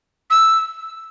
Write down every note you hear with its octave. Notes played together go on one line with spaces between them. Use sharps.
E6